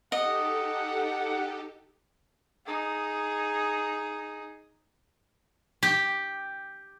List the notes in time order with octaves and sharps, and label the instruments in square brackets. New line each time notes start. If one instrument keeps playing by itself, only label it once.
[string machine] D#4 G4 A4 [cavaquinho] D#5 [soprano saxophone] F#5
[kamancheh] D#4 G#4
[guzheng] G4